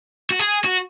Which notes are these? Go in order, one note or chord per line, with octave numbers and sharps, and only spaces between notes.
F#4
G#4
F#4